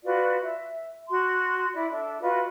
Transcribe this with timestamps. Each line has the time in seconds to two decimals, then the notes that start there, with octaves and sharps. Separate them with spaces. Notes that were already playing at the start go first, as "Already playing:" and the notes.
0.04 F4 F#4 B4 D5
0.42 E5
1.09 F#4 C6
1.73 E4 D5
1.91 D4 A4 E5
2.21 F4 F#4 B4 D#5